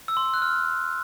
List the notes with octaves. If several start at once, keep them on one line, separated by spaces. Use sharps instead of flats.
E6
C6
E6
F#6
F6